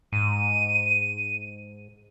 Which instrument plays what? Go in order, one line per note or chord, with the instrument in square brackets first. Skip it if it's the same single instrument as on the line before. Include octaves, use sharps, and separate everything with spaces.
[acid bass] G#2 [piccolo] D#7